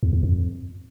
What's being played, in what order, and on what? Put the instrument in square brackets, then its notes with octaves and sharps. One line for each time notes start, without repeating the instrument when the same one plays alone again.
[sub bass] E2
E2
F2